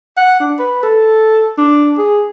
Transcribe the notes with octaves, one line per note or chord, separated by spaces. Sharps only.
F#5
D4
B4
A4
D4
G#4